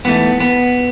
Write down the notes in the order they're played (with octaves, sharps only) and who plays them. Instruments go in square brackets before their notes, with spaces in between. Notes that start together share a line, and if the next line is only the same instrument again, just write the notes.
[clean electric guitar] G#2 E3 A3 B3
B3